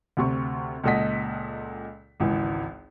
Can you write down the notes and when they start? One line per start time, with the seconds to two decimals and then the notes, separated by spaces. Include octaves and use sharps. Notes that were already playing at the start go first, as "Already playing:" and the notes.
0.17 D2 C3 C#6
0.84 C#2 A#2 A4 D#5 F#5 B6
2.20 G#1 C#2 E3